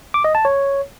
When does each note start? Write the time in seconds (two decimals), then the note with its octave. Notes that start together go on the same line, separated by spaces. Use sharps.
0.14 D6
0.24 D#5
0.35 A5
0.45 C#5